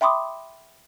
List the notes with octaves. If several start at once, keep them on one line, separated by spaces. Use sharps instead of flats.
E5 G5 B5 C6 D6 D#6